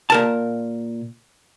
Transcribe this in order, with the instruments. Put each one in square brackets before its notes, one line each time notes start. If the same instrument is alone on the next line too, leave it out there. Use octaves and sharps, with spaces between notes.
[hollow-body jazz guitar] A#2 A#4 A5